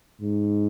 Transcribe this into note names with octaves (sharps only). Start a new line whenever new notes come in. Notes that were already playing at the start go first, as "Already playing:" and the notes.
G#2